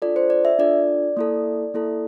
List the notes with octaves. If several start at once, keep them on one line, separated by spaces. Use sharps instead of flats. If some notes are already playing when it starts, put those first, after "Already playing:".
D4 F4 A4 D5
C5
D5
E5
D4 F4 A4 D5
A#3 E4 A4
A#3 E4 A4